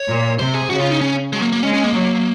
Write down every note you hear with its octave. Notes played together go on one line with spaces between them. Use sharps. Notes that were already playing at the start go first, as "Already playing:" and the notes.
Already playing: C#5
A#2
C3 C5
G#4
C#3 F#4
F4
D#4
C#4
F#3 G#3
A#3
A#3
G#3 C#4
C#4
A#3
F#3